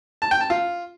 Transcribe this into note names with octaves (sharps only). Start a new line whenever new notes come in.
A5
G5
A5
F4